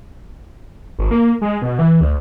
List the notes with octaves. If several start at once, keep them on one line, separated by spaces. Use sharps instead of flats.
G#1
A#3
G#3
B2
E3
D2